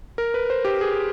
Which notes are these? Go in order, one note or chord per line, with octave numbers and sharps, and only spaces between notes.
A#4
B4
C5
G4
G#4